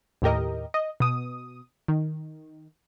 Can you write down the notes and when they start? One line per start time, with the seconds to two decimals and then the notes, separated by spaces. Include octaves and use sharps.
0.22 D#2 A2 G4 A#4 D#5
0.74 D#5
1.00 B2 D#6
1.88 D#3